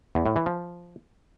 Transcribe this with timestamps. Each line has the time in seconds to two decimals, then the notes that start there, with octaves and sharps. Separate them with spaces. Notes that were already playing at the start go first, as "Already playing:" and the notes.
0.15 E2
0.26 A2
0.36 E3
0.46 F3